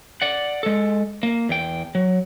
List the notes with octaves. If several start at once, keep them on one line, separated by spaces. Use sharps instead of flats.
D5 F#5
G#3 A4
A#3
E2 G5
F#3